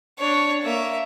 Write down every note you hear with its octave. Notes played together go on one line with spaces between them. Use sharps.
D4 C#5
A#3 E5